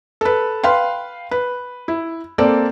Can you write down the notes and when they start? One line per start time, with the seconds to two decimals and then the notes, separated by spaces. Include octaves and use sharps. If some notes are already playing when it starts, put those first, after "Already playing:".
0.21 A4 B4
0.64 B4 F5 G5 C6
1.31 B4
1.88 E4
2.38 A#3 C4 A4 D5